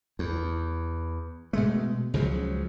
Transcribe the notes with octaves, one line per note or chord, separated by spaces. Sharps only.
E2
B2 G#3 A3
C#2 C#3 F3 F#3